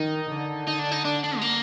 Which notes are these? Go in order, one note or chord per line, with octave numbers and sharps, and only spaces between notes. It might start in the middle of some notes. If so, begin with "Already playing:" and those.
Already playing: D#3 D#4
D3
D#4
D4
D#4
D4
D4
G#3
A#3